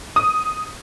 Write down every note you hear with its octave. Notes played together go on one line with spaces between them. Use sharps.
D#6